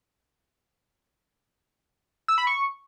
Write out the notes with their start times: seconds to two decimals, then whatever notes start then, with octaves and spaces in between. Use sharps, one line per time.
2.28 E6
2.38 B5
2.47 C#6